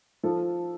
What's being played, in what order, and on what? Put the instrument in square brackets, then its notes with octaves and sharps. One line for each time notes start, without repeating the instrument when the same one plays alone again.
[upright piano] F3 F4 A4